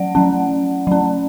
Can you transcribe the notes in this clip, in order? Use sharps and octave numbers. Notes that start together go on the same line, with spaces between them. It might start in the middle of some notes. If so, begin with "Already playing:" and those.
Already playing: F#3 C#4 D5 F#5
F#3 C#4
F#3 C#4